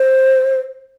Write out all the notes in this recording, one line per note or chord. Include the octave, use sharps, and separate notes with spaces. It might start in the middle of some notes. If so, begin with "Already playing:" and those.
Already playing: C5